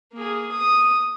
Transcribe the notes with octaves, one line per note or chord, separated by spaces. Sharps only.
A#3 G#4
D#6